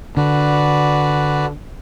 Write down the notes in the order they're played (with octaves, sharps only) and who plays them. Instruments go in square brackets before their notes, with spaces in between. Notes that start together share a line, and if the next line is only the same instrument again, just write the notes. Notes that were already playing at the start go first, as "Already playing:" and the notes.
[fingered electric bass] D3 [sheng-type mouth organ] F#4 B4 D5